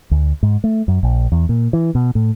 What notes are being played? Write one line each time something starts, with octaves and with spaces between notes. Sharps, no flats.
D2
G#2
A3
F#2
A#1
E2
A#2
E3
B2
A2